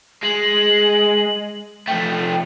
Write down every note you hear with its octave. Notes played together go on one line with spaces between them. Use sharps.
G#3 F#7
F3 A3 G5